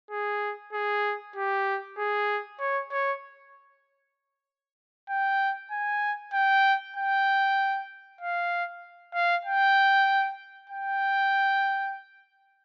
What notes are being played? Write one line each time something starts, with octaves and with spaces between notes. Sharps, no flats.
G#4
G#4
G4
G#4
C#5
C#5
G5
G#5
G5
G5
F5
F5
G5
G5